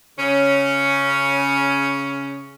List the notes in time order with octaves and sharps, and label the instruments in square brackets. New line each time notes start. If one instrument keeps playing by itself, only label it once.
[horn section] C#3 C#4